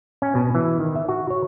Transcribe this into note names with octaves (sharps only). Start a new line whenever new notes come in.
C#4
B2
E3
D#3
E5
F#4
C#5